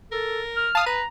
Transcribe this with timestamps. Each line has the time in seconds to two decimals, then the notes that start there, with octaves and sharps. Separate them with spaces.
0.12 A4 A#4
0.56 F6
0.75 F5 A5 D#6
0.86 B4 A#5 D#7